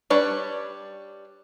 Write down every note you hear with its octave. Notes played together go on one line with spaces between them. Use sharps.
G3 D4 B4 C#5